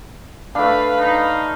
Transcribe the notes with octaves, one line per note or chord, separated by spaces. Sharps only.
A3 D4 B4 F5 B5
D#4